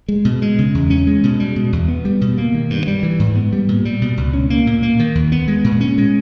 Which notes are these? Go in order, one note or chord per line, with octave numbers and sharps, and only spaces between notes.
G#3
B2
G#3
C#3
E2
C#4
G#3
B2
G3
B2
E2
B3
G3
B2
A#3
D#3
G2
G3
E3
G#2
B3
G3
A#2
G3
B2
C#2
C#4
A#3
A#2
A#3
D#3
D#2
B3
G#3
A#2
C#4
G#3